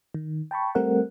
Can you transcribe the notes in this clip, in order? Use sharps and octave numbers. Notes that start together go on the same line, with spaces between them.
D#3
G5 A5 B5 C#6
G3 A3 C4 A#4 F#5